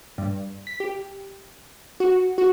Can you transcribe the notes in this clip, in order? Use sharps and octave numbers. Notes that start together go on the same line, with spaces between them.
G2
B6
G4
F#4
F#4